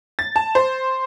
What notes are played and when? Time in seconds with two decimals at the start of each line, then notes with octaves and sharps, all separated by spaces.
0.19 A6
0.36 A5
0.55 C5